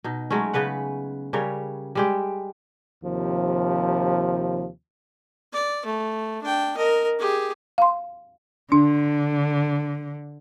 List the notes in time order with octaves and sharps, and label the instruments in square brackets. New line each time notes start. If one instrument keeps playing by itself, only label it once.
[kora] B2 D#4
F#3 G#3 A3 C#4
C#3 B3 B4 F#5
C#3 G3 A#4 C#5
G3 G#3 G4
[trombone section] D#2 C3 F3
[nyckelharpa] D5
A3
D4 G5
A#4 D#5
G4 G#4
[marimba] F5 C6
[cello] D3 [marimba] D4